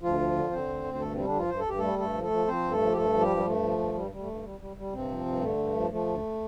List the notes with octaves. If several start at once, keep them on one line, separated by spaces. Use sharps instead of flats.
D2 F3 F4
F3
D3
D3 C4 C5
D2
D2
C5
G2 A3 A4
C3 G3 C4
D3 D4
G2 F3 F4
G2 C5
A4
G2 G4
G3 A3 A4
G2 A3 A4
F3
A3 A4
F3
F3 C4 C5
G2
A3 A4
F3
G4
G2 A3 A4
F3
G3 G4
G2
G3
G2 A3
F3
G2
G2 G3
G3
A3
G2
G3
G3
G3
G2 C3 C4
F3
G2
D3 A3
G2
F3
F3 A3
D2